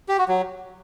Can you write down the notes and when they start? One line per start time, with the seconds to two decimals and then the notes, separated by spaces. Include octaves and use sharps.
0.09 G4
0.18 F#4
0.28 F#3